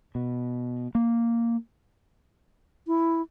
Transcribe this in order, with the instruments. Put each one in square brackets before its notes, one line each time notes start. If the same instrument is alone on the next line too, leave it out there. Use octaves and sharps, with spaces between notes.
[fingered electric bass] B2
A#3
[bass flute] E4